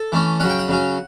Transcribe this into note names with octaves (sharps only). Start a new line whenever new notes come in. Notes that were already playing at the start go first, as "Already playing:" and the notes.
Already playing: A4
E3 A3 C#4
C#3 F#3 C#4 F#5
G5
F#5
C#3 F#3 C#4